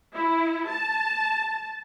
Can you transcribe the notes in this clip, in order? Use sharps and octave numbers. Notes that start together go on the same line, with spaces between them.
E4
A5